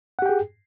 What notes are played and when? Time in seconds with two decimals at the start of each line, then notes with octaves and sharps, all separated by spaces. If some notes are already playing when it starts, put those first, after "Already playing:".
0.19 F#5
0.22 G4
0.26 G5
0.29 G#4